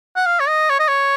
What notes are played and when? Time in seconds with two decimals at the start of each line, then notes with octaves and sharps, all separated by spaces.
0.16 F#5
0.26 F5
0.40 C#5
0.48 D#5
0.70 C#5
0.79 D#5
0.88 C#5